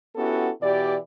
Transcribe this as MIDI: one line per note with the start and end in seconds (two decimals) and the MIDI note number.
0.16 0.49 59
0.16 0.49 61
0.16 0.49 64
0.16 0.49 66
0.16 0.49 67
0.16 0.49 69
0.61 0.96 47
0.61 0.96 52
0.61 0.96 67
0.61 0.96 74